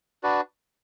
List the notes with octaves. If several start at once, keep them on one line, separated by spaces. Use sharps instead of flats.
D4 F#4 B4 D5